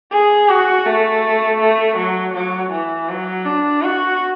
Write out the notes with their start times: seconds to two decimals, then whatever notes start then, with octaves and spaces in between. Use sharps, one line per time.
0.11 G#4
0.49 F#4
0.86 A3
1.60 A3
1.97 F#3
2.34 F#3
2.71 E3
3.09 F#3
3.45 D4
3.83 F#4